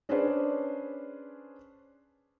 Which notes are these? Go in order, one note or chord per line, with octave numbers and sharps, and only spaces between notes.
C#4 D4 G#4 B4 C5 D5